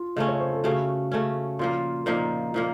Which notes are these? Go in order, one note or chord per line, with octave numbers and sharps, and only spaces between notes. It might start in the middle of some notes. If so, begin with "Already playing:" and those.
Already playing: F4
C#3 A3 C#4 D#5
C#5
C5
A4
C#3 A3 C#4 F#4
C#3 A3 C#4
A#2 F3 A#3 F4
A#2 F3 A#3 D#4
A#2 F3 A#3